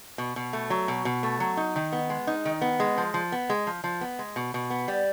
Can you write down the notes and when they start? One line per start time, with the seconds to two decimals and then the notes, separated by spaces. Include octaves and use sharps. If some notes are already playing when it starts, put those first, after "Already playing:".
0.18 B2
0.36 B2
0.53 A3
0.70 F#3
0.88 B2
1.05 B2
1.23 A3
1.40 F#3
1.57 D#4
1.76 D#3
1.93 B3
2.10 G#3
2.27 D#4
2.45 D#3
2.62 B3
2.80 G#3
2.98 F3
3.14 F3
3.32 B3
3.50 G#3
3.67 F3
3.84 F3
4.01 B3
4.19 G#3
4.36 B2
4.54 B2
4.70 B3
4.88 G3